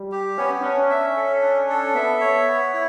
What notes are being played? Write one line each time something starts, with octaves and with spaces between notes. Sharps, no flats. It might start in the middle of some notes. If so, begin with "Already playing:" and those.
Already playing: G3
G4
B3 C#4
C#4 D4
E5
A4
D4
A4
B3 E5
C#5
B3
E4